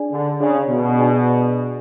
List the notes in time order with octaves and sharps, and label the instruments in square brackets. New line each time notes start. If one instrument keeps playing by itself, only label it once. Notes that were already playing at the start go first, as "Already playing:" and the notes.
Already playing: [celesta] D4 G#4 D5 G#5
[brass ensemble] D3
[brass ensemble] C#3 [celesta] D4 G#4 D5 G#5
[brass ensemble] B2
[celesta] D4 G#4 D5 G#5